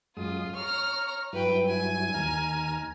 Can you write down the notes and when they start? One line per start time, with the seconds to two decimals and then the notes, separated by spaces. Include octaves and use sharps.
0.17 F#2 G#3 F4 D#6
0.55 C#5 A#5 C#6 F6
1.33 G2 F#3 E4 B4 G5
1.68 G#5
2.14 D#2 A#5 F6